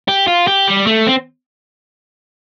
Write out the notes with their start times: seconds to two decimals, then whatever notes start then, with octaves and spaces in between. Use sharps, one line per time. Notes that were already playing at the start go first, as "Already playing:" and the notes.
0.08 G4
0.27 F4
0.47 G4
0.68 G3
0.87 A3
1.07 C4